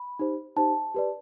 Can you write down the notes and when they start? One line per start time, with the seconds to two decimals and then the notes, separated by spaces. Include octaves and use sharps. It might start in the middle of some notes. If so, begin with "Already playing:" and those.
Already playing: B5
0.19 D#4 G4 C5
0.56 D#4 G4 C5 A5
0.94 G4 B4 D5